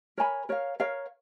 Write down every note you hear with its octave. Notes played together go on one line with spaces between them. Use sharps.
A#4 C#5 G#5 B5
A#4 C#5 F5
A#4 C#5 F5